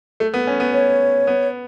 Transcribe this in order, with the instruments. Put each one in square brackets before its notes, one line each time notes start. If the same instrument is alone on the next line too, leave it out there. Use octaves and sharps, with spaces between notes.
[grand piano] A3
B3
C#4
B3
[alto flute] C#5
[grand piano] B3